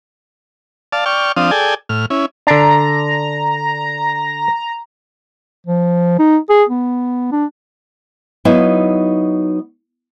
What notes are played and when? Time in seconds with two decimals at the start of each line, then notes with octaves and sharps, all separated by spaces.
0.92 D5 F5 A5
1.06 D5 G5 C#6 F6
1.37 F3 C4 D4 F5 D#6
1.51 G#4 A4 D5 G5 G#5
1.89 A2 F6
2.10 C#4 E4
2.47 D3 D4 A#5
5.67 F3
6.19 D#4
6.49 G#4
6.69 B3
7.32 D4
8.45 F#3 B3 D#4 E4 E5 F5